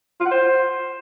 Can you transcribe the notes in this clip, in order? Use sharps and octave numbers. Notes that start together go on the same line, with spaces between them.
F4
F#5
C5